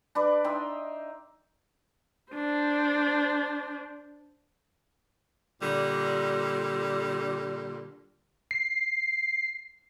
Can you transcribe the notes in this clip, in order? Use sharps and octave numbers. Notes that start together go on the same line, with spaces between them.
D4 B4 D5
D#4 E5 G5 C6
D4 C5
A#2 D3 G3
C7